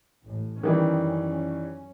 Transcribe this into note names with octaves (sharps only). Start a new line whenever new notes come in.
A1 A2
F#2 D#3 E3 G3 C#4